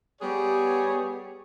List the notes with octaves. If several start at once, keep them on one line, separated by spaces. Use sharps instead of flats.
G3 B3 G#4 C#5